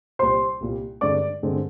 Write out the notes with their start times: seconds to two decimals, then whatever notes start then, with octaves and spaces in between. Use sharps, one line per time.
0.19 C2 A#2 G3 C5 C6
0.61 C2 A#2 G3
1.01 G2 D3 G#3 C4 D5 D6
1.43 G2 D3 G#3 C4